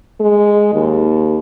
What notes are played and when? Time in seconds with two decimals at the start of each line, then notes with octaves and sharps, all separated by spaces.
0.20 G#3
0.73 D#2